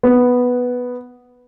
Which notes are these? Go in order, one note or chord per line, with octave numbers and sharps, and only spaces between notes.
B3